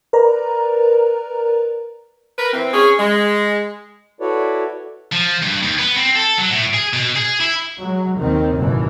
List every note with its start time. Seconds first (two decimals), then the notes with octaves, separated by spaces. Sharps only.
0.13 A#4 B4 D5 A#5
2.39 A#4 B4
2.54 E3 C4
2.73 C#4 G#4
3.00 G#3
4.21 E4 F#4 A4 B4 C#5 D5
5.13 F3
5.43 G2
5.63 D#2
5.78 B3
5.96 C4
6.15 A4
6.38 F#3
6.50 A2
6.74 G#4
6.93 B2
7.16 G#4
7.40 E4
7.82 F#3 G#3
8.19 D#2 D#3 C4
8.56 F#1 D#2 G#2 B2 E3